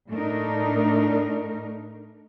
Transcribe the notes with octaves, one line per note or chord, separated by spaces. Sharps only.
A2 A3 D4 D#4 A#4